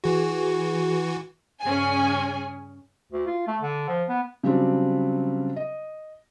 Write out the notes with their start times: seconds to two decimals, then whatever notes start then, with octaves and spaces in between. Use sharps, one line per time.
0.04 E3 F#4 G#4
1.63 G2 C#3 C#4 G#4 G#5
3.12 D2
3.26 F4
3.47 A3
3.61 D3
3.88 F3
4.09 B3
4.43 C#3 F#3 G3 C4 D4
5.56 D#5